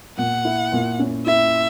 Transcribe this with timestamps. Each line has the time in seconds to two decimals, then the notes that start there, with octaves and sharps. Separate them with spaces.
0.18 A#2 F#5
0.45 E4
0.72 A#2
0.99 C#4
1.26 E4 E5